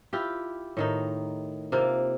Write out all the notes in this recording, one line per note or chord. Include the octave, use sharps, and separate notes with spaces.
E4 F4 G4
A2 D#3 D#4
C3 A#3 F4